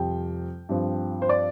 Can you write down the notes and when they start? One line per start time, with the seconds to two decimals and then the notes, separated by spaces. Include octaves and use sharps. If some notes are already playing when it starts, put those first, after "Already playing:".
Already playing: F2 C3 G3 G5
0.69 G2 F3 C4
1.22 C5
1.29 D5